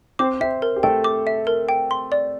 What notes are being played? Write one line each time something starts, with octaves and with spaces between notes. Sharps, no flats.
C4 C5 D6
C4 C5 E5
A#4
G4
A3 A4 G5
D6
E5
A#4
G5
C6
D5